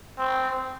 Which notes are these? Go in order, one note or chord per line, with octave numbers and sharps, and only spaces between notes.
C4